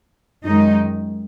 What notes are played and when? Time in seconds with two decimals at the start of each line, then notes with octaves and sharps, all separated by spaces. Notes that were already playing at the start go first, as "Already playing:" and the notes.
0.45 F#2 D#3 G#3 D#4